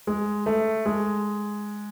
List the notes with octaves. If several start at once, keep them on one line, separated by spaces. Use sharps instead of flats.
G#3
A3
G#3